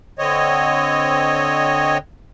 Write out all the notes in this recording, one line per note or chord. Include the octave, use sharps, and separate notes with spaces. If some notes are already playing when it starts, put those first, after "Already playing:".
D3 C4 C#5 D#5